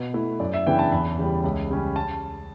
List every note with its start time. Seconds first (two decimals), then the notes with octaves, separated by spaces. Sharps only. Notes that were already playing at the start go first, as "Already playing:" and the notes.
Already playing: B2 B4
0.13 A3 E4
0.40 F#2 D5
0.54 E5
0.66 C#3 E3 B3 D4 G5
0.79 A5
0.92 E2 B5
1.18 C#3 E3 G3
1.44 C#2
1.70 C#3 G3 C#4
1.96 A5